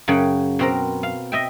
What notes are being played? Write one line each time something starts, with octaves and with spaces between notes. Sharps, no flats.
F#2 C#3 F#5 G5
B2 C4 A#4
F5
D#5 E5 G5